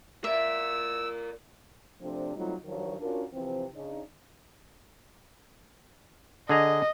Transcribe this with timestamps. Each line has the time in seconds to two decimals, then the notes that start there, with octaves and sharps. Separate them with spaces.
0.24 A#4 D5 E5 E6
2.01 C3 F3 A3 C4 D4
2.35 F#3 G3 A3 C4 D#4 F4
2.65 G2 D#3 F3 F#3
3.00 C#4 D4 F4 F#4 A#4
3.33 C3 E3 F3 C4
3.73 C#3 D4 D#4
6.49 D3 G#4 D#5 A#5